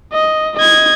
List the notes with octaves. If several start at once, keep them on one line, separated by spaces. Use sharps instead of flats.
D#5
D#5 G#6